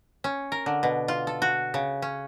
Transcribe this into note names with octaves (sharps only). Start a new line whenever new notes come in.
C#4
A#4
D3
B2
F4
A4
F#4
C#3
C#4